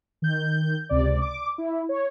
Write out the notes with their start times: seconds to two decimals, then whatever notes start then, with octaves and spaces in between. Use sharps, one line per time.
0.22 D#3 G6
0.89 C#2 C3 D5
1.22 D6
1.58 E4
1.89 C#5